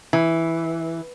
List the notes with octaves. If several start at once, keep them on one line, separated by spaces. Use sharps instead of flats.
E3